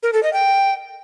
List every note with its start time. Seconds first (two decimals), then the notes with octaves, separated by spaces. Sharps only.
0.03 A#4
0.13 A4
0.23 D#5
0.33 G5